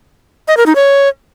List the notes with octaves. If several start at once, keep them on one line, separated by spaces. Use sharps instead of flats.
D#5
A#4
D#4
C#5